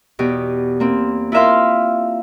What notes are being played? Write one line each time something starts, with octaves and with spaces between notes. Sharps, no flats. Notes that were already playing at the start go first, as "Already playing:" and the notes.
E2 B2 G4
A#3 C4
E4 F4 A#4 E5 F5 C6